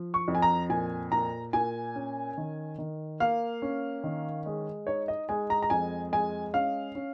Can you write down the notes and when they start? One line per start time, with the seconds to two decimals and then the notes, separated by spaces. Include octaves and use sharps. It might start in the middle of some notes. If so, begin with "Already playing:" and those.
Already playing: F3
0.14 C#6
0.28 F2
0.35 G#5
0.42 A#5
0.70 A#2 G#5
1.12 A#2 A#5
1.53 A#2 G#5
1.95 C#4
2.38 D#3
2.78 D#3
3.20 A#3 F5
3.62 C#4
4.04 D#3
4.46 G#3
4.87 D#4 C#5
5.08 D#5
5.29 G#3 G#5
5.50 A#5
5.63 A#5
5.70 F2 G#5
6.13 G#3 G#5
6.53 C#4 F5
6.95 C#4